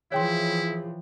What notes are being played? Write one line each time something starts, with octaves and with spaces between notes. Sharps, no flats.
E3 F3 E4 G#4 C#5 G5 C6